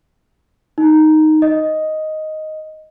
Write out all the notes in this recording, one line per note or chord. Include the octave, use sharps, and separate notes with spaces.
D#4
D#5